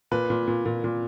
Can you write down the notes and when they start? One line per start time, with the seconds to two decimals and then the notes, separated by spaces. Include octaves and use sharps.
0.11 A#2 B4
0.30 A#2
0.48 A#2
0.65 A#2
0.84 A#2